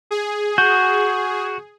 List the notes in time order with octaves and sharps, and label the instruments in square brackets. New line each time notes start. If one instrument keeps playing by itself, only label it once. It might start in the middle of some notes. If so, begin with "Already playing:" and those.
[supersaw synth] G#4
[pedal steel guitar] F#4 [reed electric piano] G6